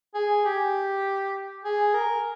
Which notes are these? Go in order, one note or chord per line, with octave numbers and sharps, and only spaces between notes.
G#4
G4
G#4
A#4